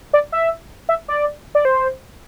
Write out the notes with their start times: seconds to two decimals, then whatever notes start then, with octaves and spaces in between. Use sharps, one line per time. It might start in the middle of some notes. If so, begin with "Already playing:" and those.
0.13 D5
0.32 E5
0.89 E5
1.08 D5
1.55 D5
1.65 C5